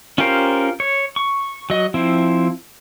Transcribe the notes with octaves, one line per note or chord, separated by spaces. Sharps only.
C#4 F4 G4 A#4 C5
C#5
C#6
F#3 D#5
F3 C4 E4